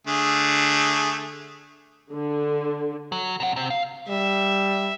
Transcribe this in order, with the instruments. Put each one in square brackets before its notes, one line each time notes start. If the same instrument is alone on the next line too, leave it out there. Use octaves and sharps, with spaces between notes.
[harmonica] D3 A3 G#4
[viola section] D3
[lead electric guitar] F#3
C3 F#5
C3 C4
F5
[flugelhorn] G3 [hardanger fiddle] E5